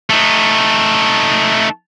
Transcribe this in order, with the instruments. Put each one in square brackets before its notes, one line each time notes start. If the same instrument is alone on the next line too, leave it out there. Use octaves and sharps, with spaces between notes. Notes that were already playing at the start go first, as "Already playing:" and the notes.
[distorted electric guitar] A3 D#4